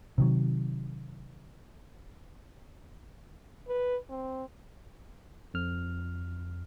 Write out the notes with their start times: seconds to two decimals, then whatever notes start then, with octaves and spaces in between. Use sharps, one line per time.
0.18 C3 D#3 F#3
3.68 B4
4.10 C4
5.54 F2 F6